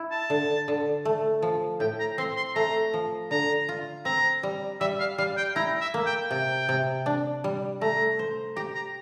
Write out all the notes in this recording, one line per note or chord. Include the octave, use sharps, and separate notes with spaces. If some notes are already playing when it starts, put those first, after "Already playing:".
Already playing: E4
A5
D3
D3
A3
F3
A2 G5
A#5
C4 C6
C6
A3 A#5
F3
D3 A#5
F4
C4 A#5
G3
G3 E5
F5
G3 F5
G5
E4 A#5
E5
A#3
G5
C3 G5
C3
D4
G3
A3 A#5
C5
G4 A#5
A#5